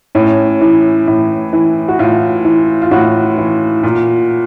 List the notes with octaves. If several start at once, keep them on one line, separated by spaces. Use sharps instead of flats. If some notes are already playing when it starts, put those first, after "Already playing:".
A2 C#4
E3
A2
E3
F#4
A2 F4
E3
F4
A2 F#4
E3
A#2